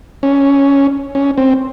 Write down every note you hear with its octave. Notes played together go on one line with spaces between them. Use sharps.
C#4
C#4
C4